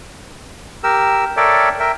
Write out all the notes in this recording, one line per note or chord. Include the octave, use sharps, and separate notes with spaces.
G4 A#4 E6
A4 A#4 C#5 D5 E5 G5
A#4 E5 G5